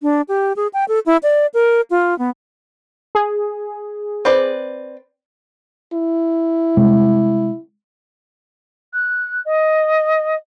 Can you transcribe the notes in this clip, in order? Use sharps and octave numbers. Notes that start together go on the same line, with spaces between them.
D4
G4
G#4
G5
A4
E4
D5
A#4
F4
B3
G#4
C4 B4 D5
E4
C3 G3 G#3
F#6
D#5